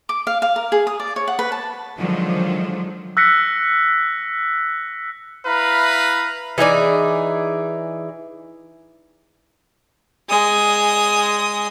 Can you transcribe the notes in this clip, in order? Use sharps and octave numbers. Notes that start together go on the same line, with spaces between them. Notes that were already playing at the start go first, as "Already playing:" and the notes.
D6
F5
F5
A#4
G#4
D#6
D5
C#5
F#5
B4
A5
D3 D#3 F3 F#3 G#3
E6 F#6 A#6 B6 C#7
E4 B4 F5 A#5 B5
E3 D#4 G#4 D5
G#3 D#6